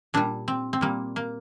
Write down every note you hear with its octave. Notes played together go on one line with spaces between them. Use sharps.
A#2 G3 D4
C4
C4
A#2 G3 A#3
A#3